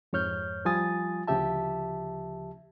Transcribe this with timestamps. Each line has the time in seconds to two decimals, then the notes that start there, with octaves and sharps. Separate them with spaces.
0.13 F2 G#2 C#5 F6 G6
0.65 F3 G3 F4 G#5 D#6 A6
1.28 D2 C#3 F3 G4 E5 A5